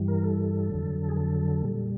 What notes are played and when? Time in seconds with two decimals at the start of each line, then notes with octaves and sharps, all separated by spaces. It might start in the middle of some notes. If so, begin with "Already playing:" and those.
Already playing: G2 E3 G3
0.08 A#4
0.23 A4
0.70 F2 D3 F#3
1.09 G#4
1.16 A4
1.63 A#2 G3